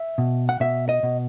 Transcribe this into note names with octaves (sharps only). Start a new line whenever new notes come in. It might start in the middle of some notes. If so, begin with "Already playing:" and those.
Already playing: E5
B2
F#5
B2 E5
D#5
B2